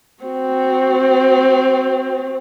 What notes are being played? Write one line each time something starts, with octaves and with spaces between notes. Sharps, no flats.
C4 F#4